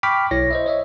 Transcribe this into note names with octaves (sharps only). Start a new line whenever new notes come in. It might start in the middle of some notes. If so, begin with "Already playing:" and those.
G5 B5 C#6 D6 F6 B6
B1 E4 C#5 A#6
C5 D#5 E5
C#5 D#5 E5